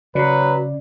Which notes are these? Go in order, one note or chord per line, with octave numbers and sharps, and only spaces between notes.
C#3 F#3 B4 D5